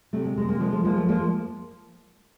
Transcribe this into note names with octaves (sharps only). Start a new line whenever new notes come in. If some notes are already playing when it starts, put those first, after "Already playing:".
C3 A3
G#3
C3 G#3
G#3 A#3
F3 G#3
A3
F3 G#3 A#3
A3
F3 G#3 A#3